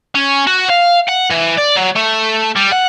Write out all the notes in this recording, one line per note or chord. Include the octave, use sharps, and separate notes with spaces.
C#4
F#4
F5
F#5
E3
D5
F#3
A3
G3
F#5